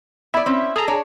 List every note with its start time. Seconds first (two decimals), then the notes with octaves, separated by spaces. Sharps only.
0.34 B3 E4 D5 E5
0.46 C4 C#4
0.76 G#4 A4 A#5
0.88 D4 C#5